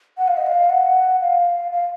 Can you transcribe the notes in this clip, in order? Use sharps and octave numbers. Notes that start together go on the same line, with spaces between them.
F#5
F5
D#5
F5
F#5
F5
F5